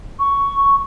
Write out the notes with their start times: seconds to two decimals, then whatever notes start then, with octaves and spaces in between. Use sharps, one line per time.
0.19 C#6